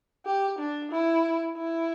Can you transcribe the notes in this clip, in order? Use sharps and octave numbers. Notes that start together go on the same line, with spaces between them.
G4
D4
E4
E4